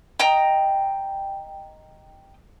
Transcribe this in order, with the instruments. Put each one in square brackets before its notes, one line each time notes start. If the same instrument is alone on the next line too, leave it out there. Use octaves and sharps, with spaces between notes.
[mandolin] D#5 G5 A#5